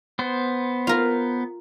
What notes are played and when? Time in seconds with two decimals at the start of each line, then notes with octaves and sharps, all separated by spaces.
0.19 B3 C5
0.87 F4 A#4